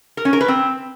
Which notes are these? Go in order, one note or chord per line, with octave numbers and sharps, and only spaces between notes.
A#4
C#4
A#4
B4
C4